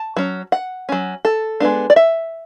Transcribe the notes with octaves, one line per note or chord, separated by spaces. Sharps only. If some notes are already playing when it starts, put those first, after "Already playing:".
Already playing: A5
F#3 C#4
F#5
F#3 C#4
A4
G#3 B3 D4
D5
E5